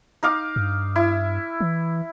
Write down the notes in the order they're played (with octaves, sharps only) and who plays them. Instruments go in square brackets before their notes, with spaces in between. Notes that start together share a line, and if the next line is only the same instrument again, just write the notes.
[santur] D#4 F5 D6
[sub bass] G2
[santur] E4
[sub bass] E3